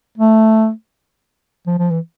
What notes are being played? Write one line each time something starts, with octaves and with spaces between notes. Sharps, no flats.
A3
F3
F3
E3